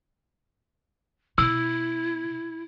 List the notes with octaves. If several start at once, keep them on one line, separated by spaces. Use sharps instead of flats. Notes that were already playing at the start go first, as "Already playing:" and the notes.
B2 E4 E6